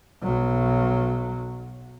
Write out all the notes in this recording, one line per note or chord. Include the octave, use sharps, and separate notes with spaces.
B1 F#3